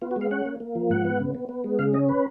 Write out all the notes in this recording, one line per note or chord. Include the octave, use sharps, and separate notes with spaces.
B3 F4
F#4
G#3 F5
C#4 F#5
A#3
A#3
F3
G#2 F#5
B3
C#3
B3
B3
G#3
C#3 F5
C#4 D#5
B4